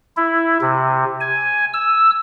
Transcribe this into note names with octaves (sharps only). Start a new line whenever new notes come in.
E4
C3
G#5
E6